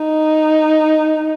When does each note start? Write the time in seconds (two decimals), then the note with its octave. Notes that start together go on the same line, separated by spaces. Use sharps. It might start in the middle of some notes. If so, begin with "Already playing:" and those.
Already playing: D#4